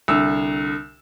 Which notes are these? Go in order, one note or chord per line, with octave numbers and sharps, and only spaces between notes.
C2 D3 E6